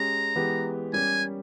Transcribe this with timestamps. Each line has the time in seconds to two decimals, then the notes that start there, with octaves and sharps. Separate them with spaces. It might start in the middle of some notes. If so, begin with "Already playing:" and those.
Already playing: G#3 C#4 G4 A#5
0.36 E3 G#3 B3 G4
0.93 G3 C#4 G4 A#4 G#5